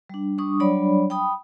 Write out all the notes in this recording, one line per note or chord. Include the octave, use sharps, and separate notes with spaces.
G3 D4
G3 D4 C#6 D#6
F#3 G3 D4 C#5 D5 B5
G5 B5 D#6